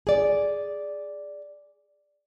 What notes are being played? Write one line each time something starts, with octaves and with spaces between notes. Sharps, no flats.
G#4 D5